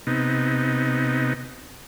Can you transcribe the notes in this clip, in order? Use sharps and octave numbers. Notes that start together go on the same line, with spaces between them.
C3 B3 D#4